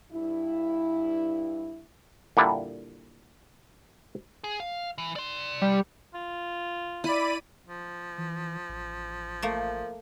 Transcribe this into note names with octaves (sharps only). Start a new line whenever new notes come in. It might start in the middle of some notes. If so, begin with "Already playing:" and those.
G2 E4
A#2 D3 G3 D4 E4
G#4
F5
E3
D5 C6
G3
F4
E4 D5 B5 D#7
F3
E3
A1
A3 A#3